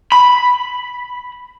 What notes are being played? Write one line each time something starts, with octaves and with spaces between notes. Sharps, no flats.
B5